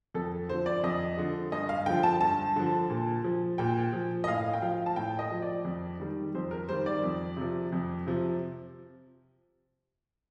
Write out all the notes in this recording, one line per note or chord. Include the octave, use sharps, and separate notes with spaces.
F2 A4
D3 F3 C5
D5
F2 D#5
D3 F3
G2 D#5
F5
D3 F3 G5
A5
G2 A5
D3 F3
A#2
F3
A#2 G5
F3
D#5
A2 F5
G5
F3 F5
A5
A2 G5
D#5
F3
D5
F2
D#3 G3
F2 C5
A#4
D#3 G3 C5
D5
F2
C3 F3
F2
C3 F3